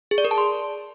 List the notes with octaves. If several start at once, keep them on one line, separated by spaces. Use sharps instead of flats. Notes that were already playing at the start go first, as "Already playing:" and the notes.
G#4
D5
A#4
A5
C6